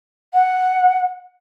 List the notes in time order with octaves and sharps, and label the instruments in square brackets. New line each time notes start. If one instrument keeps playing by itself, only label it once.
[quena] F#5